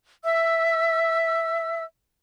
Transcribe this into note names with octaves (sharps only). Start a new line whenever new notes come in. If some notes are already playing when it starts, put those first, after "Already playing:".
E5 E6